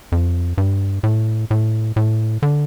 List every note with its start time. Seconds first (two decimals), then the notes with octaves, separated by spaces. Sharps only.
0.12 F2
0.58 G2
1.03 A2
1.51 A2
1.96 A2
2.42 D3